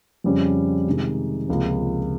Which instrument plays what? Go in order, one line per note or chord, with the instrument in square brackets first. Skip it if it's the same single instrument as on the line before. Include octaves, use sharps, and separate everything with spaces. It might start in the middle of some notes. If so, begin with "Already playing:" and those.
[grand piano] F2 C#3 G3 C#4
C3 D#3 G#3 D#4
C#2 C3 F3 A#3